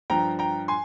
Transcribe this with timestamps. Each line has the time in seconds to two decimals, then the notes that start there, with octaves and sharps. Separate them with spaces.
0.10 G2 F3 G5 A#5
0.39 G5 A#5
0.68 G#5 C6